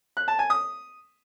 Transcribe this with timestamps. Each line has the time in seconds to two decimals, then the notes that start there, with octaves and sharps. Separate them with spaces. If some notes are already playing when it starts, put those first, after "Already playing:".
0.17 F#6
0.28 A5
0.39 G#5
0.50 D#6